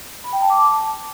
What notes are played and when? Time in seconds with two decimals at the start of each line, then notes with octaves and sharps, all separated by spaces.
0.24 B5
0.33 G5
0.41 A5
0.50 D6
0.58 A5